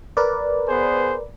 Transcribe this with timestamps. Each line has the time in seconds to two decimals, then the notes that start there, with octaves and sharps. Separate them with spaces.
0.17 A#4 B4 D5
0.68 B3 G#4 C5